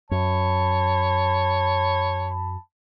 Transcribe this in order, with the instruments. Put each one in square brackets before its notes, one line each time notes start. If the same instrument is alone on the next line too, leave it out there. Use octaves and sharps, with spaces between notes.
[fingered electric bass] F#2 [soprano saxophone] C#5 [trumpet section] A5 B5